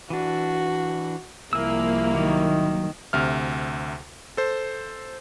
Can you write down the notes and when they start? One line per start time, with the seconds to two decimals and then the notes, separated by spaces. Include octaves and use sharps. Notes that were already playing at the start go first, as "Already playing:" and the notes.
0.10 E3 D4 F#4
1.53 C2 F3 A#3 E4 G#4 E6
2.15 D#3 F#3
3.13 D2 C3 E5 F6
4.37 A4 C5